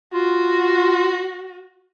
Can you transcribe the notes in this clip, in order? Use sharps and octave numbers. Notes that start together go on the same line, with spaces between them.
F4 F#4